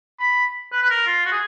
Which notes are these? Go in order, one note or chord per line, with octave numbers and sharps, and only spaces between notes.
B5
B4
B4
A#4
F4
F#4
G#4